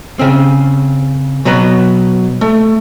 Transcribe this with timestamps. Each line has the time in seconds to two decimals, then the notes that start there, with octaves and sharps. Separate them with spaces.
0.19 C#3 C4
1.45 B2 F#3 B3 B4 A#5
2.41 A3